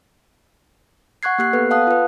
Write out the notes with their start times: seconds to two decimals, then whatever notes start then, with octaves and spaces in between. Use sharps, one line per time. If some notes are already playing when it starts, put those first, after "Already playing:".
1.23 F#5 C#6 F#6 G#6 C7
1.38 A#3 G4 F#6 C7
1.53 B3 A4 B4
1.71 F5 F#5 A5 D#6 F#6
1.87 F4 B4